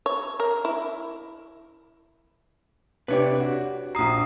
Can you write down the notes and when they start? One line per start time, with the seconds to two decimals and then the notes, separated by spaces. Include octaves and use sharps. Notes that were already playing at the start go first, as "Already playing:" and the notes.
0.06 C#5
0.40 A#4
0.65 E4
3.08 C3 D4 G4 B4 C#5 D5
3.40 F#4
3.95 A#1 A#5 D#6 C7